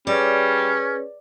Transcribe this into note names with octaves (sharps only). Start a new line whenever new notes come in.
G3 C#4 G#4 B4 C#5 D5